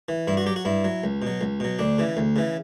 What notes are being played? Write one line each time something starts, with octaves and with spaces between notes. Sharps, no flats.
E3
G2 E4
F#4
F#3 G4
F#4
G2 E4
F#3
C#2
B2 F#3
C#2
B2 F#3
D2 D4
C#3 E3
D2
C#3 E3